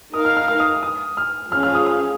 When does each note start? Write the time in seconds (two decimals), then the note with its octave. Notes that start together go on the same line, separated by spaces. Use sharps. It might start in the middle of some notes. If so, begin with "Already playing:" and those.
0.14 D#4 A#4 F5 D#6
0.25 F6
0.37 F6
0.48 F6
0.60 D#6
0.83 D#6
1.17 F6
1.52 F3 C#4 G#4 F5 F6
1.63 F6
1.75 D#6
1.86 D#6